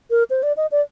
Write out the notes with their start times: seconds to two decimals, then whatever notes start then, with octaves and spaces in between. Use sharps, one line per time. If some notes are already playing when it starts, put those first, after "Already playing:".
0.11 A#4
0.30 C5
0.43 D5
0.57 D#5
0.72 D5